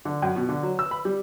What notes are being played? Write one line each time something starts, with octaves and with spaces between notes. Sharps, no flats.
D3
F#2
B2
D3
F#3
E6
B5
G3